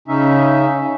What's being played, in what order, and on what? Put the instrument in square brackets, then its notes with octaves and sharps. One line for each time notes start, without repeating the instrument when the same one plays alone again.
[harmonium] C#3 C#4 D#4 E5